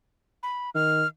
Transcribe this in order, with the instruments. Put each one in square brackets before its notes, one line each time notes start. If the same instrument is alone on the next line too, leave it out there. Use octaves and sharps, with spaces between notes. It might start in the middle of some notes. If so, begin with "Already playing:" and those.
[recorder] B5
[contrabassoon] D#3 [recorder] F6